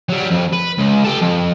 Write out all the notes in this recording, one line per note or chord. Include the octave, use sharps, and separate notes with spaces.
F#3 G3
F2
B4
C#2
G4 A4
F2